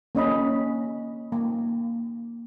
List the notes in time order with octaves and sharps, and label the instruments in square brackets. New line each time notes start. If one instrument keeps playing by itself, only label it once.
[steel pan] A#3 C#4 D#5 B5
A#3